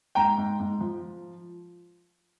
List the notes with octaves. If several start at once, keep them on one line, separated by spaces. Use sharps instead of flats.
G#2 G5 A#5
G#2
G#2
F3